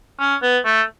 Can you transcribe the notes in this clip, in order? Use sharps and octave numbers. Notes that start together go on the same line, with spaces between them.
C#4
B3
A3